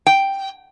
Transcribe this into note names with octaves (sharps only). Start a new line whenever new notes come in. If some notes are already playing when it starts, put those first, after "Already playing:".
G5